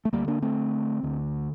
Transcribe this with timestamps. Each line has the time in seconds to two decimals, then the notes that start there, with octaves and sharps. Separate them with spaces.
0.05 A3
0.13 D2 D3 G3 A#3
0.28 A#3 D4
0.42 A3 C4
1.03 D2 D3